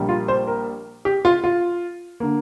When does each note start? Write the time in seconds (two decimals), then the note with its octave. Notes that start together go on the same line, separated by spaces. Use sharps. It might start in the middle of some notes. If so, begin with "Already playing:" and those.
Already playing: A#1 A#2 G3 A#3
0.09 F4
0.28 C5
0.47 A#4
1.05 G4
1.25 F4
1.44 F4
2.20 D3 A#3